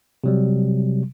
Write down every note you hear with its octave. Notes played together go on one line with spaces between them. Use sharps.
C3 F#3 G3